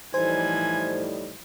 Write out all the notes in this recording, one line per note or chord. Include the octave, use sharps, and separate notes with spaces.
A2 E3 F3 G3 D#4 C5 G#5